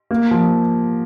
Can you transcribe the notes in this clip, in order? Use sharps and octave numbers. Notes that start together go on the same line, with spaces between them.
A#3
F3